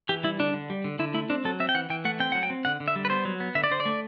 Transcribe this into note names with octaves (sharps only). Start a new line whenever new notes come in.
E3 G4
G3 E4
D3 D4
D3
G3
D3
D3 E4
A3 E4
C4 D4
F#3 A4
C4 E5
G5
E3 F#5
E3 G5
A3 F#5
C4 G5
F#3 F#5
G5
C4
D3 F#5
D3
E5
G3
B4
B3 C5
F#3
B3
D3 E5
D5
D3 C5
D5
A3